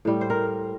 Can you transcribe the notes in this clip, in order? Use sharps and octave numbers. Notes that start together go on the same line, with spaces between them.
A2 G3
C5
A#4